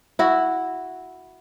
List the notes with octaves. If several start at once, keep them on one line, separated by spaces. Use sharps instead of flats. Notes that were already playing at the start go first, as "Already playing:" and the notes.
E4 F#4